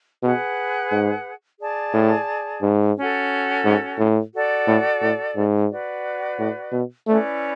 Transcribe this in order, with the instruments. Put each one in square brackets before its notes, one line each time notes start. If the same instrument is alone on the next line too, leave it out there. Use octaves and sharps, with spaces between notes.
[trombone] B2 [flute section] G#4 B4 F#5
[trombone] G#2
[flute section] G#4 D5 A5
[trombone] A2
G#2
[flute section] C#4 F#4 A4
[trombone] G#2
A2
[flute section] F#4 A4 D5
[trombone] A2
A2
G#2
[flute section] F#4 B4 D5
[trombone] A2
B2
[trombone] A3 [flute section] C#4 E4 B4 D5